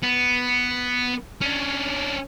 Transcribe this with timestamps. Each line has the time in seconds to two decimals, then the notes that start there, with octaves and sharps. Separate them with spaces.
0.03 B3
1.42 C#4 D4